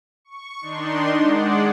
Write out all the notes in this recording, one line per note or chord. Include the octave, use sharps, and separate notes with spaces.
C#6
D#3 D4 D#4 C6
G#3 D5 F#5